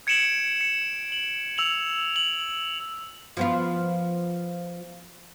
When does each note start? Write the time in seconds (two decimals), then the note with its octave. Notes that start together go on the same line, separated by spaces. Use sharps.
0.07 G#6 C#7 D7 E7 F#7
0.61 C#7
1.12 F#7
1.58 E6 F7 F#7
2.16 F#7
3.37 F3 B3 F4